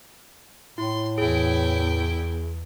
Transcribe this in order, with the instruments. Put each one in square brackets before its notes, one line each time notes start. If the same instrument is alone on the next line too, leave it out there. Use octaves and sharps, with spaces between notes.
[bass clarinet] A2 [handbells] E4 [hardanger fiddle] C6
[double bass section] E2 [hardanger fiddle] E4 G5 [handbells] G#4